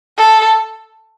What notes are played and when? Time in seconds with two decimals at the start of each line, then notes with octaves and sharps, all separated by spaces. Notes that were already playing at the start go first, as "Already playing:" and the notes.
0.18 A4